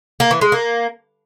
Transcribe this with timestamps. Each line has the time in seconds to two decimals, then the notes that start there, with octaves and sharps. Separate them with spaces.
0.20 A#3
0.31 E3
0.41 G#3
0.52 A#3